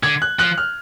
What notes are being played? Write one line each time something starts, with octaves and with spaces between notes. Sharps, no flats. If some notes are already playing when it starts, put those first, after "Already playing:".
D3 G#6
F#6
F3 F#6
F6